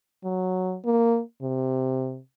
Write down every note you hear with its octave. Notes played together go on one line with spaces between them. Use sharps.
F#3
A#3
C3